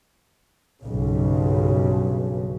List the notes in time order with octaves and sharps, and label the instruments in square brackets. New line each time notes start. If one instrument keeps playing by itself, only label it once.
[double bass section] B1 G2 C#3